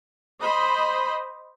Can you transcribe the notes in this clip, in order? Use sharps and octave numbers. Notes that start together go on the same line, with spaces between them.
C5 D#5 B5